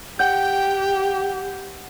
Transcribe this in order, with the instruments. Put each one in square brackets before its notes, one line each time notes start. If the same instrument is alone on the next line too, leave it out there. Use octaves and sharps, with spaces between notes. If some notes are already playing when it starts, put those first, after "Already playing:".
[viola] G4 [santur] F#5 [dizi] G5 [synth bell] G6